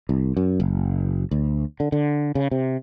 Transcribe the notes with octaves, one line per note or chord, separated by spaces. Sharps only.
C2
F#2
F#1
D2
D3
D3
C#3
C3